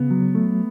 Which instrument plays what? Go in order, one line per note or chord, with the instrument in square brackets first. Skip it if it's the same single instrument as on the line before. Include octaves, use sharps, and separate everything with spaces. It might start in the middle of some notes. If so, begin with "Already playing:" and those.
Already playing: [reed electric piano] C#3 [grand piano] B3
[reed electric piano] F#3
A3